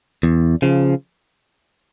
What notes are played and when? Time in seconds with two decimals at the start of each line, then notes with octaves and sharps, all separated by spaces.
0.23 E2
0.62 C#3 F3